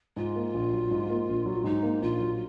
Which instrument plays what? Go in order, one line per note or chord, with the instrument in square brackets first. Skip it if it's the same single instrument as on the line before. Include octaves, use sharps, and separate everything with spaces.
[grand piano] G#2 [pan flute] F4
[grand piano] A#3
A#1
F#3
G#2
A#3
A#1
F#3
[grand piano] G#2 [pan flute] D#4
[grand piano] A#3
[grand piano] A#1 [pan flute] F4
[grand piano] F#3